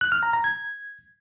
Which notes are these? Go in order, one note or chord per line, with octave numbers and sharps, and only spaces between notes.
F#6
F6
A#5
A#5
G#6